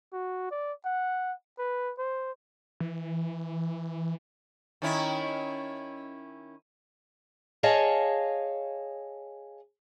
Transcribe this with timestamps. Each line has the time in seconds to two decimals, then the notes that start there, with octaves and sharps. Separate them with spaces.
0.13 F#4
0.51 D5
0.85 F#5
1.58 B4
1.98 C5
2.80 E3
4.82 D#3 C#4 E4
7.63 G#4 C#5 D#5 F5 G#5 A5